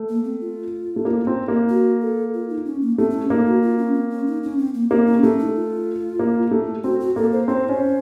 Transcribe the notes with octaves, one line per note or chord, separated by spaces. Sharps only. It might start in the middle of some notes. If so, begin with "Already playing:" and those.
Already playing: A3
A#3
C4
F4
A3
A#3
C4
A#3
F#4
A4
F4
D#4
C#4
A#3
A3 C4
C4
C#4
A#3 D#4
F#4
F4
C#4
C4
C#4
D#4
C#4
C4
A#3
A#3 C4
C#4
A3 C#4
D#4
F4
A#3
A3
C4 F#4
F#4
A#3 A4
C5
C4 C#5
C5
C#4